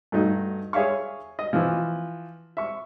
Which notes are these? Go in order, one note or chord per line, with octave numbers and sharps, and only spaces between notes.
G2 A3 D#4 F#4
G#4 C#5 E5 F5 C#6
D#5
E3 F3
E5 C#6